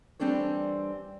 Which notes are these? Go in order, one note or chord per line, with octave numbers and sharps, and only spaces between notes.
E3 G3 C4 D4 A4 C#5